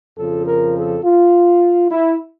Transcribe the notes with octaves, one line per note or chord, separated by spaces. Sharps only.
F2 C#3 F3 A4
A#4
A4
F4
E4